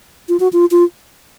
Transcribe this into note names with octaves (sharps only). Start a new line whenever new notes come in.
F4
F#4
F4
F4